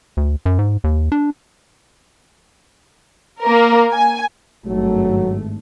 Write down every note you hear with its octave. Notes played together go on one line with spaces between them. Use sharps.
D2
F#2
G#2
D#2
D4
A#3 A#4
G#5
G#1 G2 F#3 A3